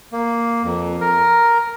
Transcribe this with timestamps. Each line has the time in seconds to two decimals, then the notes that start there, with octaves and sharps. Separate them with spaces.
0.13 A#3
0.64 F2
1.01 A#4